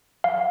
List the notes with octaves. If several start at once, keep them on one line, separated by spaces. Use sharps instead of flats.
F5